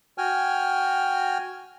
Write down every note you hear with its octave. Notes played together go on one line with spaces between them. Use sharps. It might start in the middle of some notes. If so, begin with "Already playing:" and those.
F#4 G5 G#5 F6